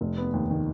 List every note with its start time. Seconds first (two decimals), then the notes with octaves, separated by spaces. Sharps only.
0.01 F1
0.18 B3
0.33 D#2
0.50 D#3